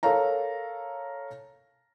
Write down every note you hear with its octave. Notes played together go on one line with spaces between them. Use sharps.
A4 A#4 C#5 F5 A#5